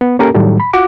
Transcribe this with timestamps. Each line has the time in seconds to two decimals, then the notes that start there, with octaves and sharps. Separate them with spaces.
0.01 B3
0.19 A#3 C#4 G4 A4 A#4
0.34 A2 D#3 F#3 G3 A3
0.60 B5
0.73 F4 F#4 F#5 D6